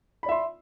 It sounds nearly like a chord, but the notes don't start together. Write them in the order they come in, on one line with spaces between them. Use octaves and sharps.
B5 D5 E5 C6